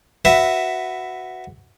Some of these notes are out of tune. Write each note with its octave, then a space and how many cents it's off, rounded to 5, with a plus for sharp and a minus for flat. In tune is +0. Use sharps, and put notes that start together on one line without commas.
F#4 +0 B4 +10 E5 +0